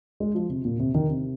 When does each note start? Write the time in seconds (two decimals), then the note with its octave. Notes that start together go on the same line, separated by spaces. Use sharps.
0.20 G#3
0.35 F3
0.50 C3
0.65 A#2
0.79 C3
0.94 D#3
1.09 C3